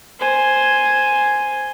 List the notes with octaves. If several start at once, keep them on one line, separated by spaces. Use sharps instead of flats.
C5 G#5